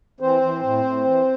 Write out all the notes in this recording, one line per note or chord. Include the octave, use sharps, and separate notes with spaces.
E3 C4 C5
E3
A2
A2
E3